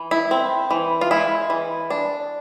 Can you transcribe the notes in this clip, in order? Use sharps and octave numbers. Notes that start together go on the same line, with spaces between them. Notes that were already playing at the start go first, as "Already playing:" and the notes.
Already playing: E3
E4
C4
E3
F4
G#3 E4
E3
D4